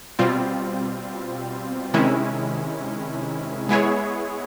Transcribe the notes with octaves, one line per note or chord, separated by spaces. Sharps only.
B2 G3 C4 F4
C3 D#3 G#3 C#4 E4
G#3 B3 E4 G#4 C#5